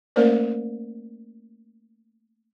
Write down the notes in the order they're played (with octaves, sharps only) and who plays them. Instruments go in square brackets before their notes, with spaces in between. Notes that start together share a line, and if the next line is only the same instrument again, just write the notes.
[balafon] A3 A#3 C#4 A#4 C5 D5